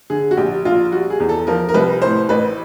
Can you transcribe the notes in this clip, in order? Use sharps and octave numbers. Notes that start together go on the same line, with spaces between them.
D3 G#4
F#4
A#1 G4
A#1 F4
G3 F#4
G#4
E2
A4
F3 A#4
A#4
C2 B4
A2 C5
A1 B4